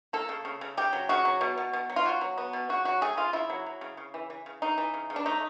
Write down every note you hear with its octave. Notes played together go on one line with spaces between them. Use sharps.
A#3 A4
C#3
C#3
C#3
C#3 G4
F#3
C#3 F#4
F#3
B2
B2
B2
F#3
F4
B2 F#4
F#3
B3
B2
C#3 F#4
F#3 F#4
A3 G#4
C#3 F4
C#3 E4
F#3
F#3
C#3
C#3
E3
E3
C#3
C#3 D#4
E3
C#3
C#3
D4
A3 D#4